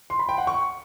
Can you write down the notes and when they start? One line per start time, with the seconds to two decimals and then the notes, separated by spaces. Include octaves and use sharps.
0.10 C6
0.19 B5
0.29 G5
0.38 F#5
0.47 C#6